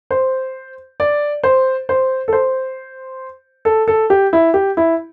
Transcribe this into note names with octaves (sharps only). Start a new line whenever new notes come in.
C5
D5
C5
C5
A4
C5
A4
A4
G4
E4
G4
E4